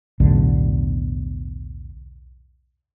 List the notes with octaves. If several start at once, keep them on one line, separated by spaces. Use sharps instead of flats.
B1 E2 A2 D3